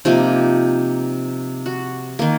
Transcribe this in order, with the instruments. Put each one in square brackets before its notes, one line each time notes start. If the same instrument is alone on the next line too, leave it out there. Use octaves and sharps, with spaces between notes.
[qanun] C3 F3 A#3 D#4
F#4
D#3 A#3